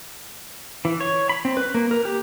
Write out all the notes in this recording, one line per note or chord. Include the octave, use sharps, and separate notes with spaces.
E3
C#5
B5
C4
B4
A#3
A#4
G4